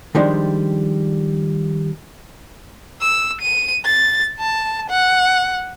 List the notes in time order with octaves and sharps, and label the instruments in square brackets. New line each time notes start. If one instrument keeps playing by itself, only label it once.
[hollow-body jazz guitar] D#3 F3 G3 G#3 D4
[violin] E6
D#7
A6
A5
F#5